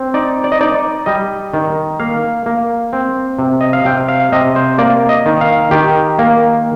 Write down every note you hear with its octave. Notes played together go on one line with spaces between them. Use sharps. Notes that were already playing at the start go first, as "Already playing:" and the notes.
Already playing: C4
D#4 D5
D5
D#5
D#4 D5
G3 D#5
D#3
A#3 F5
A#3
C4
C3
D#5
F5
C3 G5
F5
C3 D#5
C5
A#3 D5
D#5
D#3
F5
D#3 G4
A#3